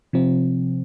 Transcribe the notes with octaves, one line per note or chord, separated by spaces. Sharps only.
C3 F3 C4